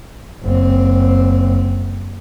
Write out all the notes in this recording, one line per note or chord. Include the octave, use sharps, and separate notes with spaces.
F#1 C4